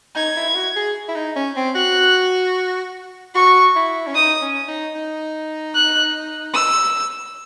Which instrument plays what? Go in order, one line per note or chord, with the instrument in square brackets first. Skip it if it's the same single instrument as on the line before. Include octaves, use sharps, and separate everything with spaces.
[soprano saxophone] D#4 [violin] G#6
[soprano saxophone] E4
E4
F#4
G#4
E4
D#4
C#4
C4
[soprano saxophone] F#4 [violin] F#6
[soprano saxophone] F#4 [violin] C#6
[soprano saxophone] E4
C#4
[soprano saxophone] D#4 [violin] D#6
[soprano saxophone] C#4
D#4
D#4
[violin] F#6
E6